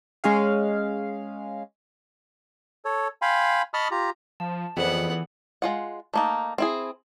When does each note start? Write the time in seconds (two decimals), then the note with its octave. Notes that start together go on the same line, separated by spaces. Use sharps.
0.24 G#3 C#4 G#4 F5
2.85 A4 C#5
3.22 F5 G5 G#5 B5 C6
3.74 D#5 A5 B5 C#6 D#6 F6
3.91 F4 G4 A#5
4.40 F3 A5
4.77 F2 E3 B3 F4 G#4 D5 F#5
5.62 G#3 F4 F#5
6.14 A3 A#3 D#4
6.58 C4 E4 G#4